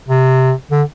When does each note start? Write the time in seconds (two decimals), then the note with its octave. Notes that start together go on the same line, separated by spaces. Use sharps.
0.08 C3
0.71 D3